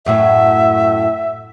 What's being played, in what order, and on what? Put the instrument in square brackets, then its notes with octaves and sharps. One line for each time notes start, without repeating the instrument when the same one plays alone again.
[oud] F#2 A2 F#3 [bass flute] E5